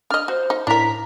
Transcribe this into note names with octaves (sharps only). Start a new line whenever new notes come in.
D4 D#5 F6
F#4 C5
D#4
A2 D4 A#4 A#5 B6